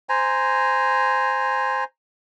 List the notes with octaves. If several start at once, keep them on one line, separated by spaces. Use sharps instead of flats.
C5 G#5 A#5